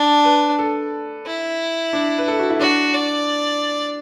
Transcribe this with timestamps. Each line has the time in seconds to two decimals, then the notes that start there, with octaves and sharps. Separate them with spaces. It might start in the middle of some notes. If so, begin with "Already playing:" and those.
Already playing: D4 D5
0.25 B4
0.59 A4
1.26 E4
1.93 D4
2.18 B4
2.28 A4
2.39 F#4
2.50 E4
2.59 D4 F#4
2.94 D5